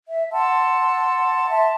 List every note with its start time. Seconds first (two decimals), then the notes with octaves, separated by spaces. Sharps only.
0.07 E5
0.32 F#5 A5 C6 E6
1.51 E5 A5 C6